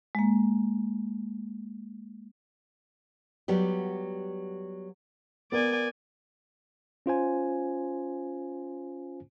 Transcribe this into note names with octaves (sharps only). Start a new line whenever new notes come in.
G#3 A#3
F#3 G3 B3 G4
B3 A#4 D5 G#5
C#4 F4 C5 G#5